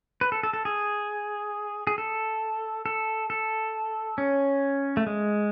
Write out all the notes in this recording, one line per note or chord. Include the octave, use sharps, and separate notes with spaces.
B4
A4
A4
A4
G#4
G#4
A4
A4
A4
C#4
A3
G#3